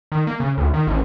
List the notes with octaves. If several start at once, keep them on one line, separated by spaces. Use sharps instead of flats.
D#3
A#3
C#3
D2
D#3
A1